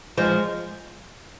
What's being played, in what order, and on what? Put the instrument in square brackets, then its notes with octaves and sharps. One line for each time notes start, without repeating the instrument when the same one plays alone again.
[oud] F3 G#3